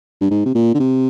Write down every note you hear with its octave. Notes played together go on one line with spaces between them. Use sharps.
G2
G#2
C3
A#2
D3
C3